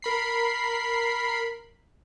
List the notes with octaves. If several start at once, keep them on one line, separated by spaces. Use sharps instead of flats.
A#4 B5 C7